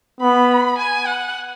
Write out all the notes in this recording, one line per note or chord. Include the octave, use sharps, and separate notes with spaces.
B3 B5
G#5
F#5